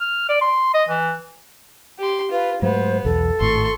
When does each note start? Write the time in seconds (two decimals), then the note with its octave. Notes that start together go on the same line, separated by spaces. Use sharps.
0.01 F6
0.29 D5
0.41 C6
0.74 D#5
0.89 E3
1.99 G4 C6
2.32 F4 B4
2.62 G#2 F#3 A3 B3 C5
3.05 B1 E2 A4
3.40 G#1 A2 C6 C#6